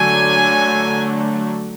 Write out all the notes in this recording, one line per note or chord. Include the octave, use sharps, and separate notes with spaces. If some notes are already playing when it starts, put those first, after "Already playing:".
Already playing: D3 F#3 A3 G#5